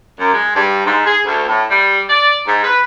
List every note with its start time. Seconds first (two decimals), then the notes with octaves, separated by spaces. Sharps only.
0.20 F#2
0.33 G#3
0.56 G2
0.86 G#2
1.06 G#4
1.25 D2
1.48 A2
1.70 G3
2.08 D5
2.47 G#2
2.64 B4